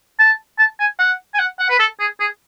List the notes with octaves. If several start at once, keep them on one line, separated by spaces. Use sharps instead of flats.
A5
A5
G#5
F#5
G#5
F#5
F#5
B4
A4
G#4
G#4